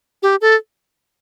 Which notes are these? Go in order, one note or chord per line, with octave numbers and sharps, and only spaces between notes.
G4
A4